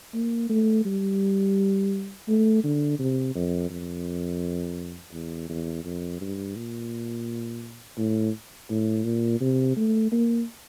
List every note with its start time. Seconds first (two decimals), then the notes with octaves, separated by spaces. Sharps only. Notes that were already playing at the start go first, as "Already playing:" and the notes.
0.14 A#3
0.49 A3
0.85 G3
2.28 A3
2.64 D3
2.99 C3
3.35 F2
3.70 F2
5.13 E2
5.49 E2
5.84 F2
6.21 G2
6.56 A#2
7.98 A2
8.70 A2
9.05 A#2
9.40 C3
9.77 A3
10.12 A#3